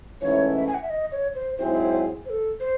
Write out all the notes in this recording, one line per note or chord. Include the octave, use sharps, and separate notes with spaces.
G#2 E3 A3 C#4 E4 C#5
E5
G#5
F#5
E5
D#5
C#5
C5
G#2 F#3 C4 E4 G#4 C5
C5
A4
C5